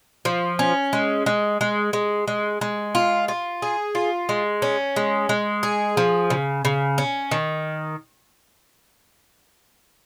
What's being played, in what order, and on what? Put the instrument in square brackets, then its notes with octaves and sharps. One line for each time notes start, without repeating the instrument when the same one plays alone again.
[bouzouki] F3
C#4
G#3
G#3
G#3
G#3
G#3
G#3
F4
F4
G#4
F4
G#3
C#4
G#3
G#3
G#4
F3
C#3
C#3
C#4
D#3